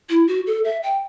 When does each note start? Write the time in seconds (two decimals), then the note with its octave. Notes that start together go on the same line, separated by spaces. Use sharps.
0.10 E4
0.28 F#4
0.47 A4
0.64 E5
0.83 G5